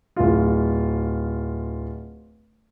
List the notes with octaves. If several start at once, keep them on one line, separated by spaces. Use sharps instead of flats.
D1 F4